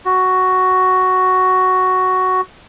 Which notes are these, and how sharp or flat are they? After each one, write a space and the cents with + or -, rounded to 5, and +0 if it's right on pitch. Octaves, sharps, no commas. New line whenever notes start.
F#4 +5